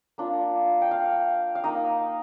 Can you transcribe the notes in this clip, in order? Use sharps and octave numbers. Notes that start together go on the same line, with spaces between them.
A#3 D4 F4
G5
F5
F5
A#3 D#4 D#5